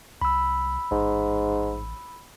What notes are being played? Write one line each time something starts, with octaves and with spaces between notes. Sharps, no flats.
C2 B5 E6
A1 G#2